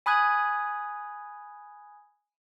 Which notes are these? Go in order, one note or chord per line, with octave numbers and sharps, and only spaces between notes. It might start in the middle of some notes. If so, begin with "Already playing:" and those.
G#5 B5 D#6 F#6 G#6